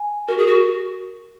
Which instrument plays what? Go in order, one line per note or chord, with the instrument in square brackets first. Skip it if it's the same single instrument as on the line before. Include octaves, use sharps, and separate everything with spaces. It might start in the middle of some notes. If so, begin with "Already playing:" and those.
Already playing: [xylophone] G#5
[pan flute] F#4 [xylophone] A#4
[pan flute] G#4
F#4